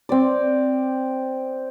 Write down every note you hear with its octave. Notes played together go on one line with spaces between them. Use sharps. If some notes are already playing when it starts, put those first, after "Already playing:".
C4 D5